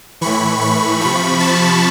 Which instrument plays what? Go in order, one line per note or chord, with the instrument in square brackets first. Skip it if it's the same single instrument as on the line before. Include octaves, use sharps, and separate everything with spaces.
[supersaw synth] A2 E3 B5 C#6
B5 C#6
C3 F3 B5 C#6
A5 B5